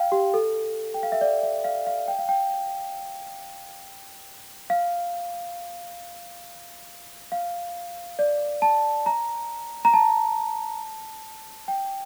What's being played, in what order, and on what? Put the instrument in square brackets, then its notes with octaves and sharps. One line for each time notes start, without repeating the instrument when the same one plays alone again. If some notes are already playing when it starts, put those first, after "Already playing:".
Already playing: [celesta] F5 G5
G4
A4
G5
F5
E5
D5
E5
F5
F5
G5
F5
G5
F5
F5
D5
A5
A#5
A#5
A5
G5